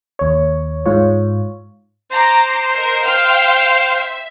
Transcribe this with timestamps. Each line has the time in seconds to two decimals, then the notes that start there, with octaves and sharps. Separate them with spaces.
0.19 D#2 C#5
0.86 G#2 F4 C#5
2.11 C5 A#5 D6
2.75 A#4 D#5
3.04 F5 G5 F6
3.97 E5